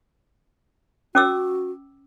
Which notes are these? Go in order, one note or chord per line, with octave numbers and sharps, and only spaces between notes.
C#4 F#4 D6 E6